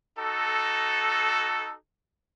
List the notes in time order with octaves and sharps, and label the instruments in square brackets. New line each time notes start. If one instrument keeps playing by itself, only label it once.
[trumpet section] D#4 F#4 A4